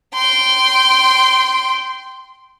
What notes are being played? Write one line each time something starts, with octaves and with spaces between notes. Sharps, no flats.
G5 C6